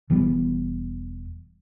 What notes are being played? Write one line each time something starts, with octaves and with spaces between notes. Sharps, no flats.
E1 E3 G3 B3